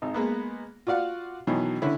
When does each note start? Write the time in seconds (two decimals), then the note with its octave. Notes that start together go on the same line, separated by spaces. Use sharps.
0.02 G#1 D#4
0.14 G#3 A#3 B3
0.87 F4 F#4 D5 F5 F#5
1.47 B2 D#3 E3 F#3
1.82 D3 C#4 E4